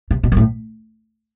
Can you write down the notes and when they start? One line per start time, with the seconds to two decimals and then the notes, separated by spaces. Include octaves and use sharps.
0.11 C3
0.23 B2
0.32 G2
0.37 A2